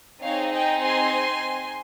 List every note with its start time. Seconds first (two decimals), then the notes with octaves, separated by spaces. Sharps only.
0.22 C4 D#4 G#4 C#5 F5
0.53 D#5 G5
0.82 G#5 C6